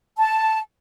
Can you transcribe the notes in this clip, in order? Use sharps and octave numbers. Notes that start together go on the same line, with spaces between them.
A5